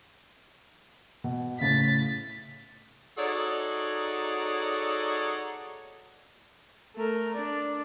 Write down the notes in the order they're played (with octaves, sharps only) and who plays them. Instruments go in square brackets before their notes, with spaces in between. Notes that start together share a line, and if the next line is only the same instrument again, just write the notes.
[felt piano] B2
[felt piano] A2 C#3 F5 [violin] A6 B6
[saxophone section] D#4 F#4 G#4 A4 C#5 D5
[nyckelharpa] A3 A#4
D4 D5